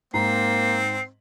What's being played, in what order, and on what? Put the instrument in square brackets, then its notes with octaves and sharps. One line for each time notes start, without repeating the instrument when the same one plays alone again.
[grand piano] G#2 A#5 [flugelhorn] A#3 [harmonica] C4 [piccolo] C7